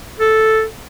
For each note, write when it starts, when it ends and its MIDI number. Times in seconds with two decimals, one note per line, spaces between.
0.20 0.64 69